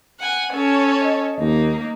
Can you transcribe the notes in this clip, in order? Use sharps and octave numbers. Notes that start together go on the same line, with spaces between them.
F#5 G#5
C#4 A4 C#5
D#5
D#2 A#3 D#4